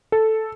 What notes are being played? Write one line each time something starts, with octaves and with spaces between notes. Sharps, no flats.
A4